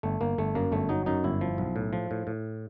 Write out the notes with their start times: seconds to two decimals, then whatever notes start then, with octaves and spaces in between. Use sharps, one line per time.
0.03 G1 A3
0.21 G1 A#3
0.38 G1 A3
0.55 F#2 A#3
0.72 G1 A3
0.89 F#3 D#4
1.06 F#2 D#4
1.24 G1 E4
1.41 F3
1.58 B1
1.76 A2
1.93 F3
2.11 A2
2.27 A2